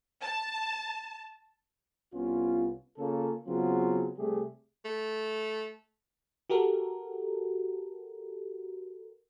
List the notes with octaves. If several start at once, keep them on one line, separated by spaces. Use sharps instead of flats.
A5
C2 B3 C#4 F4
C#3 A#3 C#4 F4 A4
C#3 F#3 B3 C4 F4 G#4
C3 G3 A3 G4 G#4
A3
F#4 G4 A4 A#4